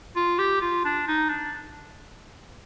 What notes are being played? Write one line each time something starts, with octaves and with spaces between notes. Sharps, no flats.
F4
G4
F4
D4
D#4
D4